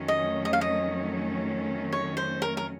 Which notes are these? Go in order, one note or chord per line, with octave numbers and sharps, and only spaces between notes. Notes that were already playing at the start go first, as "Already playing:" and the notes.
Already playing: F2 D#3 F#3 A3 C#4
D#5
D#5
F5
D#5
C#5
C5
A#4
A#4